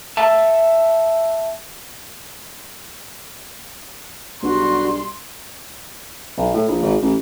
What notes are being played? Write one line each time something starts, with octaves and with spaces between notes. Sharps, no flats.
E5 A5
B1 G3 B3 D4 F#4 C6
B1
A2
A#1
G#1
A1